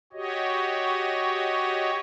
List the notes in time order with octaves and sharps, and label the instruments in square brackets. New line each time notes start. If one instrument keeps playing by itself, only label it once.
[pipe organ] F#4 G4 C#5 D#5